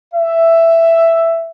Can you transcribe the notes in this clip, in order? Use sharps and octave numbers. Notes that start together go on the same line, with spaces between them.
E5